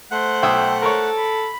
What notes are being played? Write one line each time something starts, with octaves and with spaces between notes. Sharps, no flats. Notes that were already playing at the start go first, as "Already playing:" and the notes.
A3 C5 F#5 F#6
B1 E5 G5 D#6
A4 A#4 C#5
B5